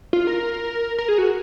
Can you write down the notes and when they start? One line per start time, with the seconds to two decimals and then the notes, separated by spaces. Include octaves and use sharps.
0.13 F4
0.27 A#4
0.98 A#4
1.08 G#4
1.18 F#4